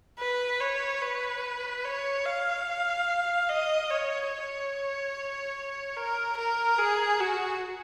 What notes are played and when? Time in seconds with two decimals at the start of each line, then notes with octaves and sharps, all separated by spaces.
0.19 B4
0.60 C#5
1.02 B4
1.84 C#5
2.25 F5
3.49 D#5
3.90 C#5
4.32 C#5
5.96 A#4
6.37 A#4
6.78 G#4
7.20 F#4